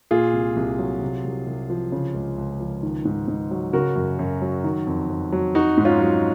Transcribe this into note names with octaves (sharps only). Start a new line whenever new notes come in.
A#2 F4 G#4
C2
C2
F#3
C3
C2
C2
F3
C#3
C#2
C#2
F3
D#3
G#2
G#2
F#3
C#3 F#4 A#4
F#2
F#2
F#3
D#3
F2
F2
F#3
F#3 D#4 F#4
G#2
C#4 F4
F#3